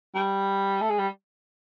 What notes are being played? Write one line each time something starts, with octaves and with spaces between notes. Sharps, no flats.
G3
A3
G#3
G3